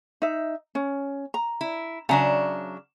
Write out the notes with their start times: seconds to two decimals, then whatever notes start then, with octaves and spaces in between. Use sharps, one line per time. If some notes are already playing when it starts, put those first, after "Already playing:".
0.22 D#4 E5
0.75 C#4
1.34 A#5
1.61 E4
2.09 C#3 F#3 D4 E5 F#5 A#5